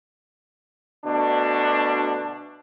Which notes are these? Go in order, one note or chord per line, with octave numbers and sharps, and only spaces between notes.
D2 B2 D4